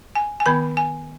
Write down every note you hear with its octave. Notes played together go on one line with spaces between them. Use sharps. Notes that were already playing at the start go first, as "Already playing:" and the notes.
G#5
G#5
D#3 B3 B5
G#5